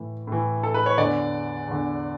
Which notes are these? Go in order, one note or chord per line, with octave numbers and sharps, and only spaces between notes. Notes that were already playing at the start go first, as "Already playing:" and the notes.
Already playing: A2 E3
A2 E3
A4
B4
C#5
E2 D3 D5
E2 D3